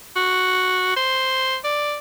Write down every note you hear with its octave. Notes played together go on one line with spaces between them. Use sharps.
F#4
C5
D5